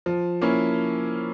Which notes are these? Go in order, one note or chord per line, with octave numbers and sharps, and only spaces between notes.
F3
A#3 C#4 E4